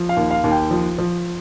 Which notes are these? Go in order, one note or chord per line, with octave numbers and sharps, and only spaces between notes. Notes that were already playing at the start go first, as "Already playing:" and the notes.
Already playing: F3
F5
D#2
F5
D#2
G5
F3
F3